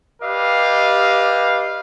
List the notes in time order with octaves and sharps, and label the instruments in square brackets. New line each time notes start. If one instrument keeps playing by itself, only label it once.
[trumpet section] G4 B4 D5 D#5 F5